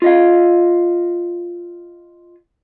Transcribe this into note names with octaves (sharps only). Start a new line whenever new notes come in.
F4 D#5 F5